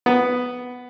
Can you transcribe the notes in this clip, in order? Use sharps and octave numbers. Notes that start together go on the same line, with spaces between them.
B3